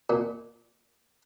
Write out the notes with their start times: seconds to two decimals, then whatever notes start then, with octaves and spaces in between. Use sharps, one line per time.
0.10 A#2